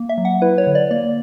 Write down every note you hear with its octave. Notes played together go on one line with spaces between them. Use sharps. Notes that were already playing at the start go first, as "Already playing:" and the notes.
Already playing: A#3
E5
F#3
F#5
E4 B4
C#5
D3
D5
A#3 D5